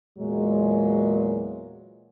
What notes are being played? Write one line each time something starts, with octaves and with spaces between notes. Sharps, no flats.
E2 A#2 F#3 G#3